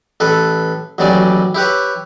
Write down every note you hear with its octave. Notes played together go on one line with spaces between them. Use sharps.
A1 A4 B4
A1 D#2 F#3 G3 D5 G#5
E4 G4 B4 C#5